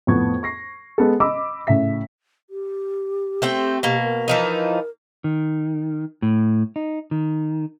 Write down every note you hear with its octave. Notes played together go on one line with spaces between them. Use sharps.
F2 A2 B3 C#6 G#6
C#6 A#6 C7
G#3 B3 A4
D#5 B5 D6 E6
A2 C#3 E5 B6
G4
A3 C4 G5
B2 A#3
A#4
E3 F3 D#4
D#3
A2
D#4
D#3